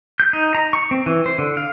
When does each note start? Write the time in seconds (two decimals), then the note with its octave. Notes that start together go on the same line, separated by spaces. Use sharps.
0.20 G6
0.33 D#4
0.55 A#5
0.73 C#6
0.91 C4
1.06 E3
1.26 C5
1.38 D3
1.57 F5